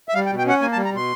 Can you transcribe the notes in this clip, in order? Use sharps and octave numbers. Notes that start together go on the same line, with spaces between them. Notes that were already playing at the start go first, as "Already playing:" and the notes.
E5
G3 F5
G5
B2
G5
C#4 F#5
A#3 G#5
A5
G3
A#5
B2 C6